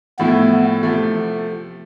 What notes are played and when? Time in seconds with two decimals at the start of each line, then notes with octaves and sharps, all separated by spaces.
0.19 A2 F3 A3 B3 E4
0.83 C3 F3 A3